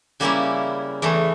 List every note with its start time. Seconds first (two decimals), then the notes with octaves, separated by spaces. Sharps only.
0.20 C#3 G3 A#3 C#4 E4
1.02 E2 E3 A3